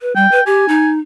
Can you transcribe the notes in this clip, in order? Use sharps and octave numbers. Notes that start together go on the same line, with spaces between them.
B4
G3 G5
B4
G4 G#5
D#4